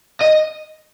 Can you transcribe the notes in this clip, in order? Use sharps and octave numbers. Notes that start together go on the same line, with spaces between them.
D#5